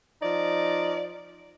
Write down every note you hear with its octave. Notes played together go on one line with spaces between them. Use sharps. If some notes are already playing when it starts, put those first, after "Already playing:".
F3 D#4 D5